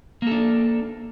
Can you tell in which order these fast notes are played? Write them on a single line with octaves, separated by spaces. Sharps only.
A#3 A4 D4